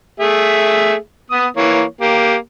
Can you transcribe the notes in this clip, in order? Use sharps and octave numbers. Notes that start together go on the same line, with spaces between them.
A3 G#4 E5
B3 D#6
E3 A#3 C#5
A#3 G4